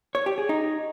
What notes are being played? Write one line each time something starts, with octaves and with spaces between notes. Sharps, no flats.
C#5
G4
G#4
D#4